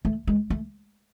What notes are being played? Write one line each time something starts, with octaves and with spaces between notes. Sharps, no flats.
A3
G#3
A3